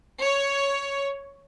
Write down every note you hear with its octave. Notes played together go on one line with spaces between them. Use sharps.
C#5